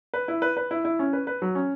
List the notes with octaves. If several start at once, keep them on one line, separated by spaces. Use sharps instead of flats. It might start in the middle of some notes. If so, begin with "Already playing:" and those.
B4
E4
B4
B4
E4
E4
C#4
B4
B4
F#3
C#4